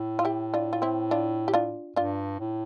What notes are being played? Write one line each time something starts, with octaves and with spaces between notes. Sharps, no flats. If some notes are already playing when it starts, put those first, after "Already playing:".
Already playing: A2
F4
E4 G4
D4 F4
F4
C4 E4
D4 F4
G4
D4 F4
G2 D4 F4
A2